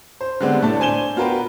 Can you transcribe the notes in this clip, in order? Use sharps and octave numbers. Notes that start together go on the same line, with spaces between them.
C5
D3 G3 G#3 B3 C4 D4
A2 A3 D4 A5
D4 C5 G#5 E7 G7
B3 F4 F#4 A#4 B4 G5